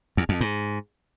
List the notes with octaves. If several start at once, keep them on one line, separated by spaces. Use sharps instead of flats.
E2
F2
G#2